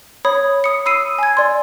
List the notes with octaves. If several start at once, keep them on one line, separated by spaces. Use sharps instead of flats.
C#5 B5 D#6
D#6 C#7
B5 D#6 E6 C7 D#7
G#5 G#6
D5 C6